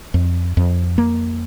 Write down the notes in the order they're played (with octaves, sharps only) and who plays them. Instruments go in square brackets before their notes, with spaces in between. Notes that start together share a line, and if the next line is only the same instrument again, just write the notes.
[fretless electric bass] F2
F2
A#3